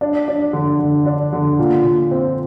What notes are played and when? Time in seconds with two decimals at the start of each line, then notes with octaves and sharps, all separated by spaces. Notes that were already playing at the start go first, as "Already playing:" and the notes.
0.01 D4
0.28 D4
0.53 D3
0.79 D3
1.06 D4
1.33 D3
1.59 A#2
1.84 A#2
2.11 C4